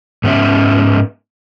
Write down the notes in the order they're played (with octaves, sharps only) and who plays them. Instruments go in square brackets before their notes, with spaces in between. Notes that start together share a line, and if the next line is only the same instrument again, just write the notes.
[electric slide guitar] G#2 B3 C#4 E5